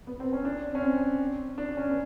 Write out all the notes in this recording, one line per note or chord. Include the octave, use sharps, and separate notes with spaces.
B3
C4
C#4
D4
C#4
C4
D4
C#4
B3